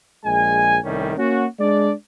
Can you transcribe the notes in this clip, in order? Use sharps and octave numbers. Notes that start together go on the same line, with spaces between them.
A#1 G#3 G#5
C2 A2 D#3 G3 C#4
A#3 C#4 F#4
G#3 D4 D5